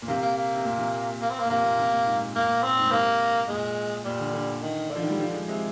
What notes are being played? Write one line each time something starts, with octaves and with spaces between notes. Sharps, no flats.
A#2
C3 A#3
A#3
A#3
C3
A#2
C3
A#3
C4
A#3
A#2
C3 A#3
A#2
C3
A#2
G#2
A#2
A#2 A#3
A#2
C4
G#2
A#2
C3 A#3
A#2 G#3
A#2 G3
D3
D3
D#3
D3
F3
D#3
G3
F3
G#3
C3 G#3